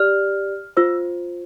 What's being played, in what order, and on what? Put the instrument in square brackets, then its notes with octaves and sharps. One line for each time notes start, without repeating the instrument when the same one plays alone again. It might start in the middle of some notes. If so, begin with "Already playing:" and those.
Already playing: [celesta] G4 D5 F6
F4 C5 E6